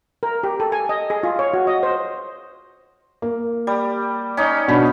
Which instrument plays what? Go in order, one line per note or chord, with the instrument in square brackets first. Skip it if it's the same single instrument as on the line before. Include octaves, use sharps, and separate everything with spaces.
[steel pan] A#4
G4
A4
G#5
D#5
G#4
F4
C#5
F#4
D#5
C5
[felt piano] A#3
[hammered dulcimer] G3
C#4 D#4
[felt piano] B2 D4 B5